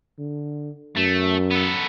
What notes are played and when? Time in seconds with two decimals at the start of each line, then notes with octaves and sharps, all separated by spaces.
0.19 D3
0.97 F#2 A3
1.51 B3 A4